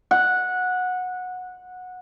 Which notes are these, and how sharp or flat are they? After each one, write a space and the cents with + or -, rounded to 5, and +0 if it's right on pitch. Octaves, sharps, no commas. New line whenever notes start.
F#5 -15